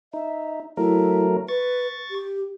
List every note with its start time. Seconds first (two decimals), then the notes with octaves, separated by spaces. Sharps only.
0.13 D#4 E5
0.77 F#3 A3 E4 A#4
1.48 B4 C#6 A6
2.11 G4